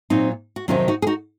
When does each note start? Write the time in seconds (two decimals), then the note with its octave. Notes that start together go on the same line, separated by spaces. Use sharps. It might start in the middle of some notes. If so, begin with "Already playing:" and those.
0.10 A#2 F#3 C4 D#4
0.56 F#4
0.68 F2 C3 D#3 F#3 C#4 F4
0.88 D#4 F#4
1.02 G#4
1.07 D#4 F#4